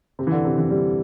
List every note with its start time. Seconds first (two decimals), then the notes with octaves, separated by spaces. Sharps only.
0.19 C3
0.27 E3
0.32 D3
0.45 C3
0.58 E3
0.70 G3